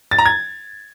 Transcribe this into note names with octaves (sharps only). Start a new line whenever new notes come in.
A6
A#5
G#6